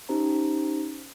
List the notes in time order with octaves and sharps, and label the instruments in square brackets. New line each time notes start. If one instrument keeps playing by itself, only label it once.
[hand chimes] C#4 D#4 G4 C5 A#5